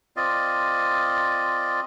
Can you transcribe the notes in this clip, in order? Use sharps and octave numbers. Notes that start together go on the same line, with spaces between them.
C4 F4 D5 D#5